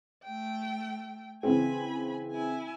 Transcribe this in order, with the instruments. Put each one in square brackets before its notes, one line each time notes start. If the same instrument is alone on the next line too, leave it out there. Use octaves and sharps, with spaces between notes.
[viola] A3 G5
[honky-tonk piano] C#3 E3 C4 [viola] G#5 B5
[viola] E4 G#5